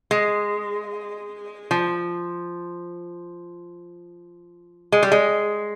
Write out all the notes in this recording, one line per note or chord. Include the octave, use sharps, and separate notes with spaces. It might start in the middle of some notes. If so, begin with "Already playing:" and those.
G#3
F3
G#3
G3
G#3